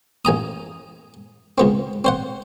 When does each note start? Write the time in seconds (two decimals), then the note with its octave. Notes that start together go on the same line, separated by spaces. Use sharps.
0.25 A1 G#5 A#5 D#6
1.58 C#2 B3 C4
2.05 C4 C5 F#5